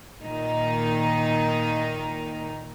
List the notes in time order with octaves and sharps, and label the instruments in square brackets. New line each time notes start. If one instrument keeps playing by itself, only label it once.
[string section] A#2 D#3 D#4